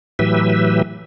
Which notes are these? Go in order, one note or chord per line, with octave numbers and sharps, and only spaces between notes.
A2 E3 F#3 G4 B4 E5